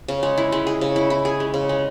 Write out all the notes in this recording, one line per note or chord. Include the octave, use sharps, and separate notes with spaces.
C#3
G#3
E4
G#3
G#4
C#3
E4
E4
G#4
G#3
C#3
G#3